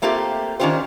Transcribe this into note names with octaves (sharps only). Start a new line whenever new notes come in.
A3 A#3 C4 F4 G4
D#3 C#4 D4 F4 G4 C5